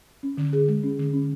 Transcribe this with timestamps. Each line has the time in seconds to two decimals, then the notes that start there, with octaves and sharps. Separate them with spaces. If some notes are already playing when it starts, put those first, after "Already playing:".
0.23 C#4
0.37 D3
0.53 G#4
0.68 G#3
0.83 C#4
0.99 D3
1.14 C#4